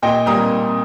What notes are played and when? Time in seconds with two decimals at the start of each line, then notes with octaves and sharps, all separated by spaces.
0.02 A#2 D#5 G5
0.26 G3 A#3 D#4 A#5 D#6